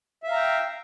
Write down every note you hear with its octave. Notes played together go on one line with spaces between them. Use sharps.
E5 F5 G5 A#5